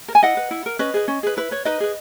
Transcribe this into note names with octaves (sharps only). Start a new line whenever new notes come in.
A#4
G#5
E4 D#5 F#5
B4
E4
A#4
C#4 B4 D#5
G#4 B4
C#4
G#4 B4
E4 B4
B4 C#5
D#4 B4 D#5
G#4 B4